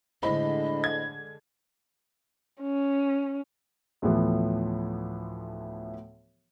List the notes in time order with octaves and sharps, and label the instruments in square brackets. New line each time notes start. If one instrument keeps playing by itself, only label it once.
[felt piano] A2 C5 B5 [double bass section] D3 G#3 [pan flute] D#5
[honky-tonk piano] G#6
[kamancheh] C#4
[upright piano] D2 A2 E3 F3 B3